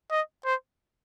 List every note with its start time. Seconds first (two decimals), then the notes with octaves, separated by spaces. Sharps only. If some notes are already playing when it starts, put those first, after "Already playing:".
0.11 D#5
0.45 C5